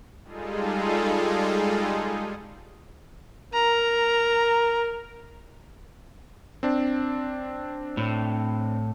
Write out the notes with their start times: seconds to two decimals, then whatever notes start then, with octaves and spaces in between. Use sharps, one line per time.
0.24 G3 G#3 D#4 F4 G#4 A4
3.54 A#4 A#5
6.63 C4 D4
7.97 A2